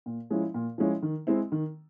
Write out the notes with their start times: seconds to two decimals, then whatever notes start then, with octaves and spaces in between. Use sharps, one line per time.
0.06 A#2
0.30 F3 G#3 C#4 E4
0.54 A#2
0.78 F3 G#3 C#4 E4
1.02 D#3
1.27 G#3 C4 E4
1.52 D#3